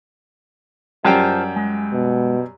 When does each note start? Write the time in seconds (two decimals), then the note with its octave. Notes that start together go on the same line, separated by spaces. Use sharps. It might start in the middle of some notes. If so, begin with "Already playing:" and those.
1.05 F#2 G3 F4 C5 G5 A5
1.56 G#3
1.93 B2